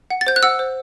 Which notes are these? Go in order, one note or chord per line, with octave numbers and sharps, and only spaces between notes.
F#5
A6
C5 G6
F#6
F#5 E6
C5